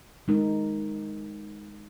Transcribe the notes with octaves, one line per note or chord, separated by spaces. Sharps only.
G#3 D#4 A#4